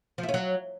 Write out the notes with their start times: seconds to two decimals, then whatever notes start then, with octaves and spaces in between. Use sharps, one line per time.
0.18 F3
0.23 E4
0.29 C#4
0.34 F#3